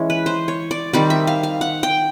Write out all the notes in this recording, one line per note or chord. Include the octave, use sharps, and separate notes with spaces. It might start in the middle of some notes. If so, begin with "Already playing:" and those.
Already playing: E3 G#3 C#4
B4
C5
C#5
D5
D#3 G3 C4 D5
E5
F5
F5
F#5
G5